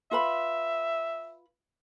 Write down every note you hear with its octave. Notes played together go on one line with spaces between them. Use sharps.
F4 B4 E5 B5